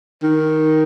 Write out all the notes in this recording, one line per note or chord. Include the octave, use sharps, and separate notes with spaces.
D#3